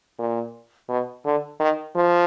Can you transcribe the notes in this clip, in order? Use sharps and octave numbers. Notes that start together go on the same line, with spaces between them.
A#2
B2
D3
D#3
F3